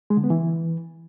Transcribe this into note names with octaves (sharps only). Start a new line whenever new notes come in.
G#3
D3
B3
E3